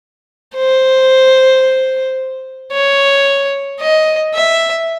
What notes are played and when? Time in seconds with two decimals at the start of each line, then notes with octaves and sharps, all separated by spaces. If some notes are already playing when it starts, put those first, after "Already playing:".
0.56 C5
2.73 C#5
3.80 D#5
4.34 E5